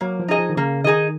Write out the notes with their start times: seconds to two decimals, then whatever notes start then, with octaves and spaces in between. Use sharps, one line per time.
0.01 F#3 A#3
0.20 F3
0.28 D#4 G#4 D#5
0.38 F3
0.50 D#3
0.57 C#3 A#3
0.84 D#3 D#4 G#4 D#5